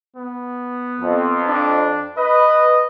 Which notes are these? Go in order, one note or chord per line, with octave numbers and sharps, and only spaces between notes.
B3
F2
D4
B4 D#5